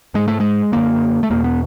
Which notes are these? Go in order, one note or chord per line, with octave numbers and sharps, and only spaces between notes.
G#2 G#3
A3
G#3
F#2 D3 A#3
A3
E2 B2 A#3
B3